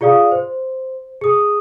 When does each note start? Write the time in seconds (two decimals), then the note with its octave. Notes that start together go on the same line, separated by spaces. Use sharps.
0.01 F4 G#4 D5 F5 D#6
0.32 C5
1.21 G#4 D#6